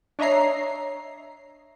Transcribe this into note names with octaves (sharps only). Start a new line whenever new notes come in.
D4 C#5 D#5 E5 A#5 C7